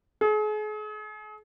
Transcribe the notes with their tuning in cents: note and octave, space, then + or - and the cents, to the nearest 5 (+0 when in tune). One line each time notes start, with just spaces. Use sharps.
G#4 +40